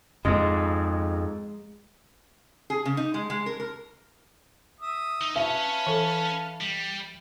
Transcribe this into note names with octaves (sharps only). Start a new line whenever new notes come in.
F2 G#2 G#3
G#4
C#3
D#4
G#3
G#3
A#4
A#4
E5 D#6
D#4
C#4 B4 C#5 E5 F5 A5
E3 A4
G3